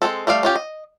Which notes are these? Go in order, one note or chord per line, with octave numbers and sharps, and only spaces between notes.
G#3 A#3 C4 A4
G3 A3 D5 F5
C#4 F4 G4
D#5